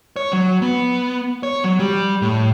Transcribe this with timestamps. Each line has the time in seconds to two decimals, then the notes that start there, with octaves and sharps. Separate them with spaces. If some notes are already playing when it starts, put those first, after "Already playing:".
0.16 C#5
0.33 F#3
0.62 B3
1.43 C#5
1.64 F#3
1.79 G3
2.22 A2